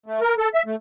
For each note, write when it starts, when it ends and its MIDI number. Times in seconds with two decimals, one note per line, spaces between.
0.06 0.20 57
0.21 0.35 70
0.38 0.49 69
0.54 0.63 76
0.66 0.76 57